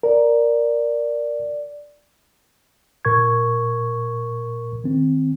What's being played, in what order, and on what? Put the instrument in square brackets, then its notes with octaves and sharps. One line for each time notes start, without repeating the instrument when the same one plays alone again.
[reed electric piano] A#4 [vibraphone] D5
[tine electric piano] A#2 A#4 C#6 G#6
D#3 C4